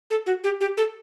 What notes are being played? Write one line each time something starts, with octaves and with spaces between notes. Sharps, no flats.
A4
F#4
G4
G4
A4